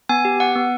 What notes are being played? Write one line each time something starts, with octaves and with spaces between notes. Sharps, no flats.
B3 G#5
G4
B3 F#5
B3